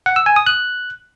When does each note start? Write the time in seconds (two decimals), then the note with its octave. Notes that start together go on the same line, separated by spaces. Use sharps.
0.06 F#5
0.16 E6
0.26 G#5
0.36 D#6
0.47 F#6